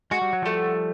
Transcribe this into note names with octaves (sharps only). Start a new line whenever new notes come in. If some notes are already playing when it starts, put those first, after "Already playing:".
G#3 F#4
G3
F#3
F3 G3 A3